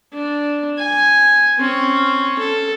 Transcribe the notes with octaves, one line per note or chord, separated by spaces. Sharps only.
D4
G#5
C4 C#4
A4